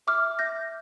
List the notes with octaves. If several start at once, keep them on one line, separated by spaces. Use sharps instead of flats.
E5 D6 F6
E5 G6 A#6